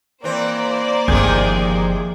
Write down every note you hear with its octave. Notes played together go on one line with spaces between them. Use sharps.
E3 A#3 C4 C5 D5
G1 C3 D#3 F3 G#3 G#4 G6